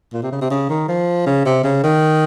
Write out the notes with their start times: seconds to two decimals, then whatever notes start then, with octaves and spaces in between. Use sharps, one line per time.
0.13 A#2
0.23 C3
0.32 C#3
0.41 C3
0.51 C#3
0.69 D#3
0.88 F3
1.27 C#3
1.46 C3
1.64 C#3
1.83 D#3